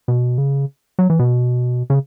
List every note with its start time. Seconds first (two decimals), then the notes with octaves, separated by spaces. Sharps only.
0.08 B2
0.38 C#3
0.99 F#3
1.10 E3
1.19 B2
1.90 C#3